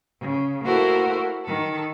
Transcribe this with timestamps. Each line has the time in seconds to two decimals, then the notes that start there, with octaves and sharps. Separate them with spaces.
0.21 C#3
0.64 A#3 E4 F#4 A4 A#4 C5
1.44 D#3 A4